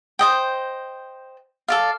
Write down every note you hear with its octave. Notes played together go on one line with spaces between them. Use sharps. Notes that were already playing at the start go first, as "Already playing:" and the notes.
C5 D#5 G5
A4 D5 F5